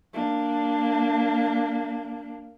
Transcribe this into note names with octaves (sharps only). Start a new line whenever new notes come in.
A#3 D4